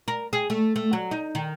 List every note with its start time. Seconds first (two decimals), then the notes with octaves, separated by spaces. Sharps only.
0.08 A#4
0.33 G#4
0.50 A3
0.76 A3
0.93 F#3
1.11 D#4
1.35 D#3